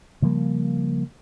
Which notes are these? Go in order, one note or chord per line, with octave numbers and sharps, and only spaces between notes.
C#3 F3 G3 A#3